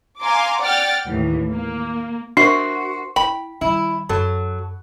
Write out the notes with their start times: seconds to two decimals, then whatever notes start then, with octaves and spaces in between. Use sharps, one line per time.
0.20 F5 G#5 A#5 C6 D6
0.61 D5 F#5 G5 F6 A6
1.08 D#2 A2 E3
1.52 A#3
2.37 D4 F#4 A#4 C5 E5 C6 C#6 C7
3.16 E4 G5 B5
3.61 D#3 G3 E4
4.09 F#2 F#3 A4